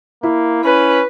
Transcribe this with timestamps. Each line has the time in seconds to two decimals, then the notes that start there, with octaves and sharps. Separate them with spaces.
0.23 A#3 E4
0.64 C#4 B4